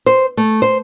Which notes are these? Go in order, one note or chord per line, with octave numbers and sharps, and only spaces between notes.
C5
A3
C5